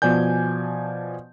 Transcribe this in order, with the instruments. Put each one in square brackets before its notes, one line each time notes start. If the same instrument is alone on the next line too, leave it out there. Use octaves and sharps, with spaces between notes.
[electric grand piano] B2 F3 D5 G#5 G6